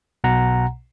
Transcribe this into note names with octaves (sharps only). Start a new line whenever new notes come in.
B1 B2 F#5 A#5